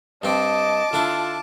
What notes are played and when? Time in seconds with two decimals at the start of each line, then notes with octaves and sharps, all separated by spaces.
0.23 G2 C4 D#5 A5 D6
0.93 D3 D4 E4 F4